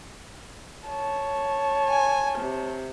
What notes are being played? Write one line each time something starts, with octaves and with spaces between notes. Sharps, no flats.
C#5 A5
G#5
C3